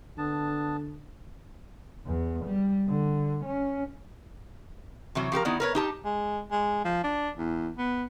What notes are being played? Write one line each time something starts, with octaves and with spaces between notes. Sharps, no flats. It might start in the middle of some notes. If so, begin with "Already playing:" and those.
D3 B3 D4 A5
E2
G3
D3
C#4
C3 E3 F#3
F3 G4 A4 A#4
D#3 B3 D#4 E4 D5
A#4 B4 C#5
D#4 G4 A5
G#3
G#3
F3
D4
E2
B3